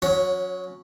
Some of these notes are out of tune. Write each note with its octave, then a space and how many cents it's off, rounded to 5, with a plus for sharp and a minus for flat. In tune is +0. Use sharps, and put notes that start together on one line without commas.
F#3 -30 C#4 +0 F#5 +0